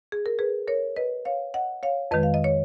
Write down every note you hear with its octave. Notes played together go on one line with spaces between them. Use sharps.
G#4
A#4
G#4 B4
A#4 C#5
B4 D#5
C#5 F5
D#5 F#5
C#5 F5
F2 D#3 G#3 B4 D#5
F5
D#5
C#5